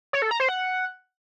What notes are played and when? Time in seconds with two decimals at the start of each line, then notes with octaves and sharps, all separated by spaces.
0.13 C#5
0.22 A4
0.31 A#5
0.40 C5
0.49 F#5